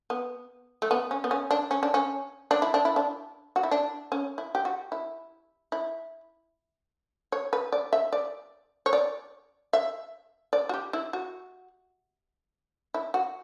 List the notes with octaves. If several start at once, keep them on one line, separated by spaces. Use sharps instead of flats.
B3
A3
B3
C#4
B3
C#4
D4
C#4
D4
C#4
D4
E4
D4
E4
D4
F#4
E4
D4
C#4
E4
G4
F#4
E4
E4
C#5
B4
D5
E5
D5
C#5
D5
E5
D5
F#4
G4
E4
F#4
E4
F#4